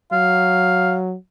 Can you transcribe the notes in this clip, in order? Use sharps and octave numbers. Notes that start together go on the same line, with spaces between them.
F#3 F5